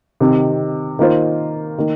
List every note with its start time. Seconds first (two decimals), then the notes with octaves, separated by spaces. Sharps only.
0.20 C3 D#3 C4
0.99 D#3 A#3 F4 C5
1.78 D#3 A#3